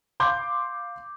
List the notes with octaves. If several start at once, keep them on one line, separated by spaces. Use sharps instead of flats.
F5 C6 D6 G6